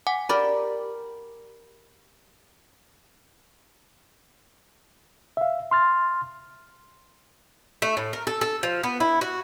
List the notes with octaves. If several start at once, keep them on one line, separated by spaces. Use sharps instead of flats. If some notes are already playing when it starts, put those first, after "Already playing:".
F#5 G#5 D6
G4 A#4 D5 A#5 B5 D6
E5 F5
C6 F6 A6
A3
A2
A#4
A4
A4
F3
B3
E4
F#4